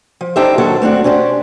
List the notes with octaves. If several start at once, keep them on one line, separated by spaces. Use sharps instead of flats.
F3
D4 D#4 G4 A4 C5 E5
D#2 F#3 F#4 A4 C5
A3 C4 D4 F#4
C#4 D4 G4 B4 C5